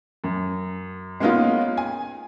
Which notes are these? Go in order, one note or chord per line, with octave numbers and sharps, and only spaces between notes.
F#2
G#3 A#3 B3 C#4 D#4 F4
G#5